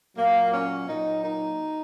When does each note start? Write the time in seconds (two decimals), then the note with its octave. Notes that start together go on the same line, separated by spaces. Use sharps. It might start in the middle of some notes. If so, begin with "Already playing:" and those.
0.16 A#2 F#3 A#3
0.51 C#4
0.86 A#2 F#3 D#4
1.22 D#4